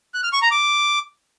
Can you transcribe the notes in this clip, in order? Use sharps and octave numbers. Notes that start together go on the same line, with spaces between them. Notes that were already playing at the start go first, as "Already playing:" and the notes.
F#6
F6
C#6
A#5
D6